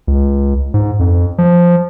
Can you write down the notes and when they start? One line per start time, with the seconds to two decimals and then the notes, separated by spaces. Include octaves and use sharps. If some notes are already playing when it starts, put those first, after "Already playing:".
0.07 C#2
0.74 G#2
0.99 F2
1.38 F3